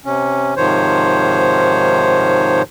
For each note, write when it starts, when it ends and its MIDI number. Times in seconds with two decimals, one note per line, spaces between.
0.05 0.54 48
0.05 0.54 61
0.57 2.62 44
0.57 2.62 48
0.57 2.62 51
0.57 2.62 53
0.57 2.62 72
0.57 2.62 73